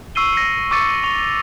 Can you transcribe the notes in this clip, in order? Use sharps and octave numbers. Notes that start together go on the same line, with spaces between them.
C#6 E6 C7 D#7 G7
A#6 C#7
C#6 D6 E6 A6 C#7
C#6 F7 G7